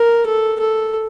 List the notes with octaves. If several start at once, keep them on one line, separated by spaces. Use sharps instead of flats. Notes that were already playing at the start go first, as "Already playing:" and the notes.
Already playing: A#4
A4
A4